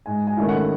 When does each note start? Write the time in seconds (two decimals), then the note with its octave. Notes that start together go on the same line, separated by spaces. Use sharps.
0.06 G#2 G#5
0.27 G#5
0.37 D#3 A3 C#4 E4
0.49 F#5